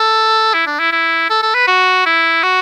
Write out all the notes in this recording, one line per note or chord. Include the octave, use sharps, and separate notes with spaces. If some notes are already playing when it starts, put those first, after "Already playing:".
Already playing: A4
E4
D4
E4
E4
A4
A4
B4
F#4
E4
F#4